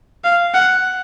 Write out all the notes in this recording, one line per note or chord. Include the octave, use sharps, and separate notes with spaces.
F5
F#5